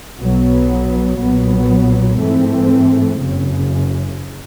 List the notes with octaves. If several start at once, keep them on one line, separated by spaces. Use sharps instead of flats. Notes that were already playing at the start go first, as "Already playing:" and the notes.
B1 B2 F#3 B3
B1 A#2 F#3 B3
G#2 E3 A3 C4
F#1 F#2 C#3